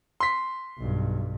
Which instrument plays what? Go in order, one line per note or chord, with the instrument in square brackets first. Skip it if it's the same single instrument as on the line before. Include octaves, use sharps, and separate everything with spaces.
[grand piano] C6 B6
[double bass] B1 G2